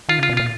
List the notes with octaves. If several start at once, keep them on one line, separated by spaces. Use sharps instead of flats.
D#3 F4
C#3 F4
B2
A#2 F4